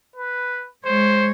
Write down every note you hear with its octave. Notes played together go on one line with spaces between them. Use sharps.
B4
G#3 C5 C#5